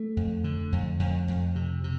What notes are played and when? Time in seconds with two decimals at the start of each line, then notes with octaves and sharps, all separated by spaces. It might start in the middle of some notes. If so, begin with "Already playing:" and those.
Already playing: A3
0.17 F2
0.44 D3
0.72 F2
0.99 F2
1.28 F2
1.56 C3
1.84 C3